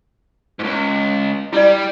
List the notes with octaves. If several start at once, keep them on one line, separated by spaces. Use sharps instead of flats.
C#2 G#2
G3 E4 D5